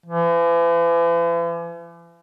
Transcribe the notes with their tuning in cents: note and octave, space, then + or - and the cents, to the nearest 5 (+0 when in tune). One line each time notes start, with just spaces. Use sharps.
E3 +45